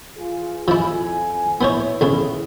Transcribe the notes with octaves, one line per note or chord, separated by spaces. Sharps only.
E3 F4 G#4
F2 F3 E4 G#5
B3 E4 C5 C#5
E2 C#3